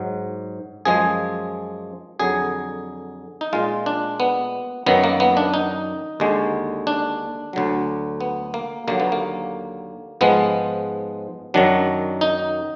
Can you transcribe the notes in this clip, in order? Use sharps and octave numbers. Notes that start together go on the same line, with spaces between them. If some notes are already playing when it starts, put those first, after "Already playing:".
Already playing: G#2 F#3
F#2 F3 G#3 G#4
F2 D3 F#3 G#4
D#4
A#2 G#3 F4
D4
B3
F#2 D#3 F#3 B3
A#3
B3
D4
D#4
D#2 D3 G#3
D4
D2 D3 F#3
B3
A#3
D#2 D3 F#3 A#3
B3
A#3
G#2 F3 G#3 B3
F#2 D#3 F#3 D4
D#4